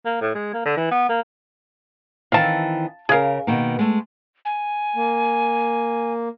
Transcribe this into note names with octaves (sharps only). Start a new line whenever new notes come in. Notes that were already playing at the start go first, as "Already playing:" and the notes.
A#3
A2
G#3
A#3
D3
E3
B3
A#3
D#3 E3 C4 F5 A5
C#3 G#4 A#4 F5
B2 D#3 A#3
G#3 A3
G#5
A#3